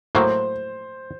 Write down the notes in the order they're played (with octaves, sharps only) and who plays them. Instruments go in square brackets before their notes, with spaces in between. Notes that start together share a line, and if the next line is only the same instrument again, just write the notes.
[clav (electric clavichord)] A2 F#3 A#3 [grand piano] C5